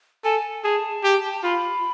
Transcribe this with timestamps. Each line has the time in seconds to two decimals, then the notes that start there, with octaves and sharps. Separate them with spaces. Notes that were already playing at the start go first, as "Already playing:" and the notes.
0.24 A4 G#5
0.63 G#4 A5
1.04 G4
1.43 F4 B5